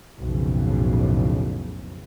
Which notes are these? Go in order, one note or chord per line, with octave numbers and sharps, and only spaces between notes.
B1 F2 A2 C#3